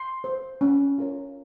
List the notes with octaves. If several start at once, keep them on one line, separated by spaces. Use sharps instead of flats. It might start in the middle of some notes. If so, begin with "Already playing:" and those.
Already playing: C6
C5
C#4
F4 A#4 C#5